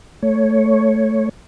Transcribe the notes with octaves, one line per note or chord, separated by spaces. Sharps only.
A3 C#5